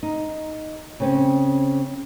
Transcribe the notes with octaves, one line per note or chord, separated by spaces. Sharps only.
D#4
C#3 C4 C#4